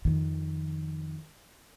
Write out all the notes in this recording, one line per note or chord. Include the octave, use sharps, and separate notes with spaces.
F2 D#3